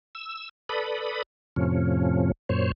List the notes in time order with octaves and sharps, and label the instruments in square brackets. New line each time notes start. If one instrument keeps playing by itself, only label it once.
[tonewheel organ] E6
A4 B4 D5 B5 D#6
F2 A2 C3 F3 C#4
F#2 A#2 C5 C#5